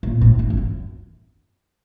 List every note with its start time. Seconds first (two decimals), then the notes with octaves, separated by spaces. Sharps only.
0.03 A#2
0.21 A2
0.39 G2
0.50 F2
0.57 F#2